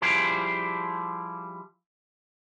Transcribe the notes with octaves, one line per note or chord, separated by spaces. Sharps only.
F3 G3 E4 G4 G#4 C5